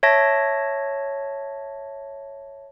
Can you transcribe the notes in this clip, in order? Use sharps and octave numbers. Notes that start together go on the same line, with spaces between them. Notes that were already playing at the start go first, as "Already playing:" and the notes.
C#5 E5 A5 A#6